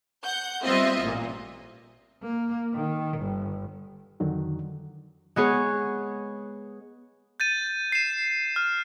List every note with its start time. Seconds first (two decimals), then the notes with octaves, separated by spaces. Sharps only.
0.24 F#5 G6
0.63 G3 B3 C4 F4 D#5 E5
1.01 A1 A#2 A#3
2.23 A#3
2.74 D#3
3.19 G1
4.20 F2 D3 D#3 F#3
5.36 G#3 B3 G#4 C#5
7.40 G6 A6 D#7
7.92 C7 E7
8.56 F6